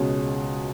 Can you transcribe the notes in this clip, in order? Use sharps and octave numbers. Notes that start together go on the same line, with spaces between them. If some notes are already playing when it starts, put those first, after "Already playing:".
Already playing: C#2 B2 G#3 C#4